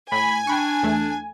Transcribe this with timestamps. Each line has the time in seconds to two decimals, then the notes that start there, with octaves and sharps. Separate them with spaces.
0.12 A2 G#5 B5
0.47 D4 G5 B5 C#6
0.83 E2 A3